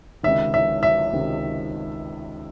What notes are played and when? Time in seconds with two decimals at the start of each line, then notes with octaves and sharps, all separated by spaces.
0.23 C#2 C3 D#3 E5
0.54 E5
0.83 E5
1.13 C#2 C3 D#3